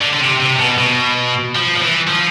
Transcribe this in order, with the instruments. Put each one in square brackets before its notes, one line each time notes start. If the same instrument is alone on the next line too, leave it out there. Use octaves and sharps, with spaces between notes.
[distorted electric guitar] D3
D3
C3
C3
B2
B2
F3
F3
E3
F3